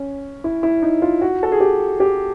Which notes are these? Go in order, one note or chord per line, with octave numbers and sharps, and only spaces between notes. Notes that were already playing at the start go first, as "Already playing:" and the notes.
Already playing: C#4
E4
E4
D#4
F4
F#4
A4
G#4
G4
G4